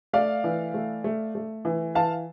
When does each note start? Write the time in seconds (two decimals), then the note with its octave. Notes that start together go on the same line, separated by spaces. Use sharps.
0.13 A3 D5 F5
0.44 E3
0.74 A3
1.04 A3
1.35 A3
1.65 E3
1.95 E3 F5 A5